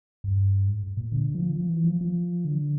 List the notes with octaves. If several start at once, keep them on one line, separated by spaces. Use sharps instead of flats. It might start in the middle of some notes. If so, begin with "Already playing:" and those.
G2
G#2
A#2
D3
F3
F3
E3
F3
F3
D3